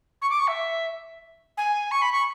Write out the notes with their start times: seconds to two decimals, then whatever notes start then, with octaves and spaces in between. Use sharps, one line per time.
0.22 C#6
0.30 D6
0.39 C#6
0.48 E5
1.57 G#5
1.91 C#6
2.02 B5
2.13 C#6